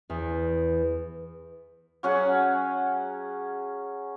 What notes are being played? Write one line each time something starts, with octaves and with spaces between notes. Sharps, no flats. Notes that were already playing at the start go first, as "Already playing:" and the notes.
E2
F#3 C#4 G#4 F#5